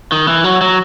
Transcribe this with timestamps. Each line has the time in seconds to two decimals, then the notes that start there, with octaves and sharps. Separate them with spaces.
0.12 D#3
0.28 E3
0.44 F#3
0.61 F#3